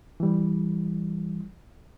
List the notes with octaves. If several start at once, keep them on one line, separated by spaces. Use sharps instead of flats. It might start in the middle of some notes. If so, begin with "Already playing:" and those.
E3 G3